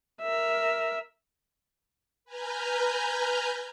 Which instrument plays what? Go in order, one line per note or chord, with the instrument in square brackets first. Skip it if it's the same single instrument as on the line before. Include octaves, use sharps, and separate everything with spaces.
[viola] A#4 E5
[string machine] B4 G#5 A#5 F6 G6